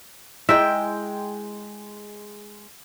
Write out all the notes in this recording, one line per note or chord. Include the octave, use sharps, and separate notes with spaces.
G#3 E4 D#5 E5 G5